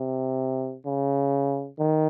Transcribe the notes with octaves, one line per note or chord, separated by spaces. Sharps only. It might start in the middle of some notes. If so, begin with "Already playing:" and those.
Already playing: C3
C#3
D#3